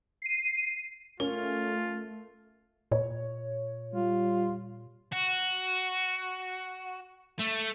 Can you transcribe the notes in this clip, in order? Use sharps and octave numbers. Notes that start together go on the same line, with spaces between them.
C7 D#7
A3 C#4 F4 A#4
A#2 C#5
G3 F4
F#4
A3